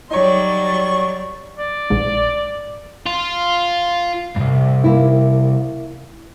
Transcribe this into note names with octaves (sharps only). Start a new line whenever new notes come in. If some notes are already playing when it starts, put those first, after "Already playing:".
F#3 G3 D#4 C#5 D5 C#6
D5
A#1 G#2
F4
C2 G2
A#3 E4